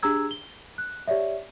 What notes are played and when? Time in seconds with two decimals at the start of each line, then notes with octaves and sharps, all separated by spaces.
0.03 D4 G4 G#4 A#5 E6 G#6
0.31 G7
0.78 F#6
1.07 G4 C#5 D5 E5